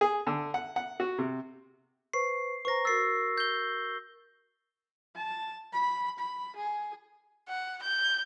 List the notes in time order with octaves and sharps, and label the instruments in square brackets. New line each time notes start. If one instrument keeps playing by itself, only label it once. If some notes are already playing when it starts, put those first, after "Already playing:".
[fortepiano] G#4
D3
F#5
F#5
F#4
C3
[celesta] B4 C5 C#6 [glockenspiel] C7
[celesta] B4 C5 A#5 [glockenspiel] C#6 A#6
[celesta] F#4 A#4 A6 [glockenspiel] E6 C7
[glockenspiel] G6 G7
[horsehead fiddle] A5
B5
B5
G#4
[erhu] F#5
G6